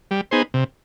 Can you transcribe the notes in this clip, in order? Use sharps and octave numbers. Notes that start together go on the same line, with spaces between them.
G3
B3 D#4 G#4 C5
C3